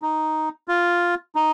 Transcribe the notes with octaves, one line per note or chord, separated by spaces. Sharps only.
D#4
F4
D#4